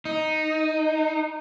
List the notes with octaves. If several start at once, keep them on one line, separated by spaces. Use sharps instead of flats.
D#4